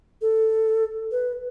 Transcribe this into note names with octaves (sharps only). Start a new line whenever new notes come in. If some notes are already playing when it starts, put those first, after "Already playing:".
A4
B4